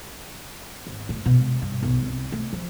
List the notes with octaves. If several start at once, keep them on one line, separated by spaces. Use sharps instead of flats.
G#1
A2
B2
G#3
G2
B1
C2
A3
F3